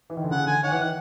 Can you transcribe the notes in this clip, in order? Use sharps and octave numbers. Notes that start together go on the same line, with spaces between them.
E3
D#3
D3
C#3 F#5
D3 G#5
D#3 C#5 F#5
E3
D#3